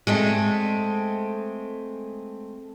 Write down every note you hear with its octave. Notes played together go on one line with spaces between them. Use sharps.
G#3 A3 C4